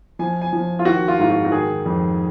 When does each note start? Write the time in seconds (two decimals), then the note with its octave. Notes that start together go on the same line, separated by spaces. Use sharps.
0.19 F3 G#5
0.42 G#5
0.53 F3
0.79 F4
0.85 D#3 F#4
1.08 F4
1.19 G#2 F4
1.30 F#4
1.45 F#4
1.52 D#3 G#4
1.86 F2